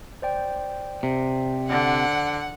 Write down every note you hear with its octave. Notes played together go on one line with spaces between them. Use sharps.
C5 D5 G5
C3
D3 F#5